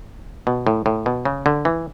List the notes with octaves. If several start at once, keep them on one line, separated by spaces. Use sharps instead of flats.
B2
A2
A2
B2
C#3
D3
E3